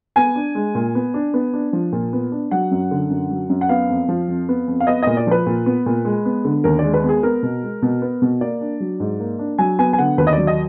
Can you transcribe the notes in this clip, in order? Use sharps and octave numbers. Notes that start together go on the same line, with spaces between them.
B3 G#5
D4
G#3
A#2
B3
D4
B3
D4
F3
A#2
B3
D4
F#3 F#5
F#2
D3
F#2
F#3
F#2
F#5
B3 F5
F2
F3
F2
B3
F2
F5
B3 D#5
A#2 D#5
D5
F3 B4
A#2
B3
A#2
G#3
B3
D3
D#2 A#4
G#3 D5
B4
B3
G#4
B3 A#4
B2
G#3
B2
B3
B2
A#3 D5
D4
F#3
G#2
A#3
D4
F#3 G#5
B3 G#5
G#5
D3 F#5
D#2 B4
D#5
F#3 D5
D#5